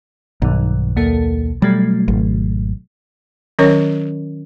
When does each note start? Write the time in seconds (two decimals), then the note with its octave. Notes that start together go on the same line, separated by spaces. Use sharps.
0.42 B1 G2 D#3
0.96 D#2 A#3 A4
1.62 B2 F#3 G3 A3
2.08 G#1
3.59 D#3 F#3 C#4 A#4 C#5